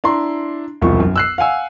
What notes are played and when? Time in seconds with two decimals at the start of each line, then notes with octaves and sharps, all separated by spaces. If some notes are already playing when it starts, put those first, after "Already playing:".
0.04 D4 E4 A#5 C6
0.81 E1 C2 F3 C#6
1.00 F#2
1.16 E6 F#6 C7
1.38 F5 F#5 G#5 E6